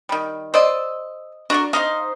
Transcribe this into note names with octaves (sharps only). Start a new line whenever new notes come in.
D#3 G3
C5 D5 D#5 E6
D4 F#4 A#4 D5
D#4 C5 D#5 F5